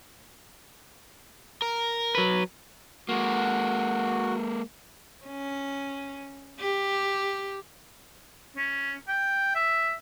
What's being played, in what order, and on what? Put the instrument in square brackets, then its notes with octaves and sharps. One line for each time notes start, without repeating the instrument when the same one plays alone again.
[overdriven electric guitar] A#4
[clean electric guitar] F#3 B4
[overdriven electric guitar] G#3 A#3 [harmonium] F#4
[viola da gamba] C#4
G4
[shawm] C#4
G5
E5